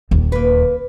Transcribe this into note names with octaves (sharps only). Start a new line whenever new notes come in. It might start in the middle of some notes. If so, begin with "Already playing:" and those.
D#1 D#2
A#3 B4